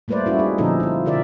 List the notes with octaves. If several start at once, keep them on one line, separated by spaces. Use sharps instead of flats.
G3 A3 A#3 B4 C5 D5
G3 C#4 E4 F#4
D#4 G#4
A#2 D3 F3 C#4 D#4 A4
E4 F4
B2 D3 G4 A#4 D5 E5